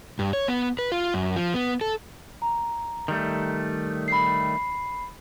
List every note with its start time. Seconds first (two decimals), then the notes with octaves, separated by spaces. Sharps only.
0.19 G2
0.33 C#5
0.48 B3
0.79 B4
0.92 F4
1.14 F#2
1.36 F3
1.54 B3
1.81 A4
2.42 A#5
3.08 D#3 G3 A3
4.08 B5 C7